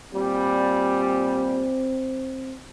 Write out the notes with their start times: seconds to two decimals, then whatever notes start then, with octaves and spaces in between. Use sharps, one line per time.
0.13 A#2 G3 C4